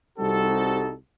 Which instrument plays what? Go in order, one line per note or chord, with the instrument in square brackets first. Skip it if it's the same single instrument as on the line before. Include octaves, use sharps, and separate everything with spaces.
[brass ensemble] C2 G3 C4 D#4 F#4 A4